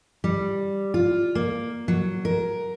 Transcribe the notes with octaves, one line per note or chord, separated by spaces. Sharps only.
G3
F4
A#3
F#3
A#4